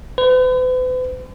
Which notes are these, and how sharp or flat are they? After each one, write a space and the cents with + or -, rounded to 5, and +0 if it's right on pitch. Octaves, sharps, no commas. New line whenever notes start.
B4 +45